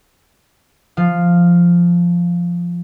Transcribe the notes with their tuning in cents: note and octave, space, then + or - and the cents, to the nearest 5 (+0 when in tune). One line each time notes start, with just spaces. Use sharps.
F3 -5 F5 +0